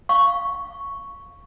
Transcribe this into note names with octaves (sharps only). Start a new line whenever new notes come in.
F5 C#6